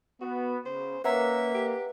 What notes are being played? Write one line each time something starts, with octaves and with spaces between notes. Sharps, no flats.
B3 F#4
C#3 C5
A#3 C#4 B4 E5 F#5 A#5
G4